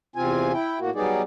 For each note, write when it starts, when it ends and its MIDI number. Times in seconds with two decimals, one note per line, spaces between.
0.16 0.52 40
0.16 0.52 48
0.16 0.52 60
0.16 0.52 65
0.16 0.52 80
0.53 0.79 64
0.53 0.79 79
0.79 0.90 45
0.79 0.90 58
0.79 0.90 66
0.95 1.22 54
0.95 1.22 55
0.95 1.22 59
0.95 1.22 63
0.95 1.22 68
0.95 1.22 74